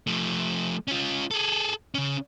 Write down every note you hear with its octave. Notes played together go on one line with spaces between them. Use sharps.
F3 A3
C#4 F4
G#4 A4
C#3 C#4